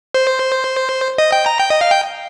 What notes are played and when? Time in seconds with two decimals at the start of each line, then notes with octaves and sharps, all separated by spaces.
0.14 C5
1.18 D#5
1.32 G5
1.46 A#5
1.60 G5
1.70 D#5
1.81 F5
1.91 G5